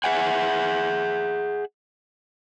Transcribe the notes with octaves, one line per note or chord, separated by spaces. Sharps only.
G#4 E5 F#5 G#5